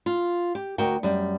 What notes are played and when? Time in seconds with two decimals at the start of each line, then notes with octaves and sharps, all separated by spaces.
0.06 F4
0.55 G4
0.78 D2 F#4 A#4 G5
1.03 F#2 G3